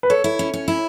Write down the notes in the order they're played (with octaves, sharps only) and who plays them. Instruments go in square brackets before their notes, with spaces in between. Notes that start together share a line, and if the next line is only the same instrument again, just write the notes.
[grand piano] B4
[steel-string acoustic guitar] A4 [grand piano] C#5
[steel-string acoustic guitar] E4
C#4
C#4
E4